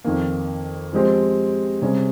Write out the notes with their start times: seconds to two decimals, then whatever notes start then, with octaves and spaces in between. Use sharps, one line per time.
0.04 F2 D#3 A#3
0.93 F3 G#3 C4 G4
1.82 C3 G3 C#4 G#4